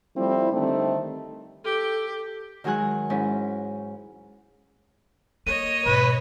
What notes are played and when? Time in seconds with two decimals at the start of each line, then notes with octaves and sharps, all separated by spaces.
0.16 F3 G3 A3 C4 E4
0.52 D3 D#3 G3 A3 C4 D#4
1.64 G4 A4
2.64 D#3 F#3 G#3 G#4 G#5 F#6
3.10 G#2 C#4 E4
5.46 A#3 C#5 D#5 D#7
5.86 G#2 B2 B4